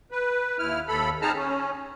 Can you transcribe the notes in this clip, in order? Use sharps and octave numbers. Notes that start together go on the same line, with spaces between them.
B4
D#2 E4 F6
D#2 A4 B5
C4 D#4 G#4 A5 A#5 F6
C#4